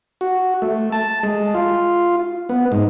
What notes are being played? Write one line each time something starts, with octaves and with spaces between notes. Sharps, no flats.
F#4
A3
A5
G#3
F4
B3
G#2